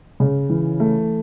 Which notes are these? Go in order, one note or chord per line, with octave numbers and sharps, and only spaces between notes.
C#3
E3
A3